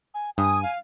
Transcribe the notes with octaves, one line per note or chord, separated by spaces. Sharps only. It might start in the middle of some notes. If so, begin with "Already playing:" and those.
G#5
G2 G#5 D#6
F5